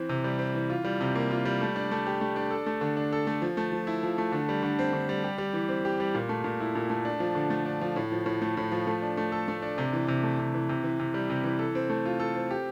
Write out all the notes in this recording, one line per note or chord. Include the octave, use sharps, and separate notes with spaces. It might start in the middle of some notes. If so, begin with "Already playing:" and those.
Already playing: E3 C4
C3
G3
C4
E3
F4
G3
C3
A#3
F4
G3
A3
D4
A3
G4
A3
D4
A4
A3
D3
D4
A4
A3
F3
A3
F3
E4
F3
A3
D3
G3
D3
C4
D3
G3
G4
G3
E3
C4
G4
G3
A#2
A3
A#2
E4
A#2
A3
D4
F3
D3
A3
D4
F3
A2
F3
A2
A3
A2
F3
A3
D4
A3
A4
A3
D4
C3
E3
C3
A3
C3
E3
C3
E3
C3
G3
C3
E3
A4
C4
A3
F4
A4
C4
G4